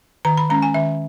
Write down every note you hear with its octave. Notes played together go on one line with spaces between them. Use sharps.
D#3 A#5
B5
G#3 C#4 A#5
G#5
D#3 E5